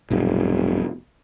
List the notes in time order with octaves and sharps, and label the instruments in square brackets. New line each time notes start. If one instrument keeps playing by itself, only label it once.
[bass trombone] F1 [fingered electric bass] B1 G2 B2